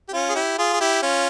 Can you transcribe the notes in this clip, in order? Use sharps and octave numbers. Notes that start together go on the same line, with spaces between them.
G4
C#4 F4
G#4
E4 G4
F4 G#4
G#4
E4 G4
C#4 F4